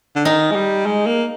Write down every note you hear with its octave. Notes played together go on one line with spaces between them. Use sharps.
D3
D#3 D#4
G#3
G3
G#3
A#3